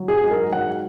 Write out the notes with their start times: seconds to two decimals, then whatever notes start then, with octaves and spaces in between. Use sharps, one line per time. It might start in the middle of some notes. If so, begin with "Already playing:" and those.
Already playing: F#3
0.08 G#4
0.24 G#2
0.31 A#4
0.52 F#3 F#5